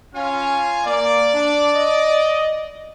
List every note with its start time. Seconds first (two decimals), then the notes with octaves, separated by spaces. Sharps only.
0.15 C#4 F4 F5 G#5
0.85 A#3 D5
1.34 D4
1.74 D#5